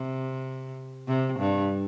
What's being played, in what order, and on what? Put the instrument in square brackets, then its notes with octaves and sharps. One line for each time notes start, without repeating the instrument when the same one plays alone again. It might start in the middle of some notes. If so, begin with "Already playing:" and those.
Already playing: [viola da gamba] C3
C3
G2